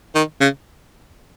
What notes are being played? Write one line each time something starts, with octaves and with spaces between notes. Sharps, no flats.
D#3
C#3